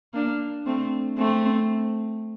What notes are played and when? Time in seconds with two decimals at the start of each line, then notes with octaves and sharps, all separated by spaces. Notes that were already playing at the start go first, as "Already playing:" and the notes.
0.14 A#3 D4
0.66 A3 C4
1.18 A3 C4